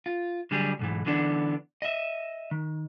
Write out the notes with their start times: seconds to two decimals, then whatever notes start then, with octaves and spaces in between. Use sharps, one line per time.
0.06 F4
0.51 D3 F#3 G3 G4 G#4
0.79 B1 G#2 E3
1.06 D3 E3 B3 D4
1.82 D#5 E5
2.51 D#3